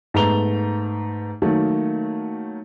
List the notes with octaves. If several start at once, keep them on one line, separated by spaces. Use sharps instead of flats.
G#2 A3 B3 A#5 F7 G7
D#3 F#3 A3 A#3